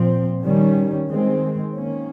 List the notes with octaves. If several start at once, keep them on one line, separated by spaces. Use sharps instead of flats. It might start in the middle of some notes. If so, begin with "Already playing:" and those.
Already playing: A#2 F3 C4
D#3 G3 C#4
D#3 G#3 C4
D#3 A#3 C#4